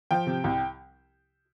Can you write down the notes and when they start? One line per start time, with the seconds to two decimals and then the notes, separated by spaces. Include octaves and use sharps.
0.11 F3 G5
0.26 C3
0.44 C2